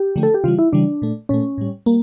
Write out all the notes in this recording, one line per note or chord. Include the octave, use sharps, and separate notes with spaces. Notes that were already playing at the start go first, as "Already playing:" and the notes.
Already playing: G4
D3 F3 A3
A4
G4
C#3 E3 G3 F4
E4
C#3 E3 G3 D4
A#2 A3
A#2 A3 C#4
A2 G3
G3 A#3